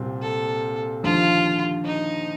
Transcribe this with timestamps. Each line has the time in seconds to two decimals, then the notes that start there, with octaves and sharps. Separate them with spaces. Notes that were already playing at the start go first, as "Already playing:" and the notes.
Already playing: C2 A#2 G3 C4
0.22 A4
1.03 D#2 D3 F3 F4
1.85 D#4